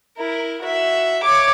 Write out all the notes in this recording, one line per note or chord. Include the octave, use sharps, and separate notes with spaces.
E4 A#4
F#4 E5
C#5 D6